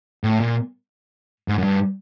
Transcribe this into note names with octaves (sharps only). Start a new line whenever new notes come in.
A2
A#2
G#2
F#2
G2